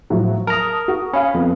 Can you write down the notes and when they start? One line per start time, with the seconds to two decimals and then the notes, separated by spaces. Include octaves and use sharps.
0.10 A2 F3 F#3
0.47 A#4 A5 A#5 D#6
0.88 F#4
1.13 C#4 F5 B5
1.34 F2 B3